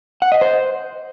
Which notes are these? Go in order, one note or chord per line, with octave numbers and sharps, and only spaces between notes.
F#5
D#5
C5